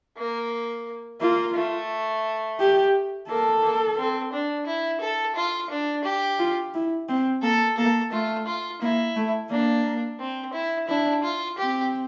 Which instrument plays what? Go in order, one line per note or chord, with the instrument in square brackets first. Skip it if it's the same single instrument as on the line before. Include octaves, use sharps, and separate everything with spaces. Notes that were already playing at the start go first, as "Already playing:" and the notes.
[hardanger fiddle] A#3
[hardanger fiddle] A#3 [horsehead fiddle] F4
[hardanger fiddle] A3
[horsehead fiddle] G4
[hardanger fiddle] A#3 [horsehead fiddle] A4
[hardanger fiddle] A#3
C4
D4
E4
A4
F4
D4
G4
[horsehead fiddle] F4
E4
C4
[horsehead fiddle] A#3 [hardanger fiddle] A4
[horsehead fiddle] A#3 [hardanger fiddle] A4
[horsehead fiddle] A3 [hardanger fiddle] F4
[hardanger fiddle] F4
[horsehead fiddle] A#3 [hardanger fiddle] E4
[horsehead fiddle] A3
[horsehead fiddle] A#3 [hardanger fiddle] D4
[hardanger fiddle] C4
E4
[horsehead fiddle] D4 [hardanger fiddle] E4
[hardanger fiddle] F4
[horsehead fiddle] C4 [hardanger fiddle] G4